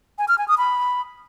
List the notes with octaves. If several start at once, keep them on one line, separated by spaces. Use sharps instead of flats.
G#5
F6
G#5
D#6
B5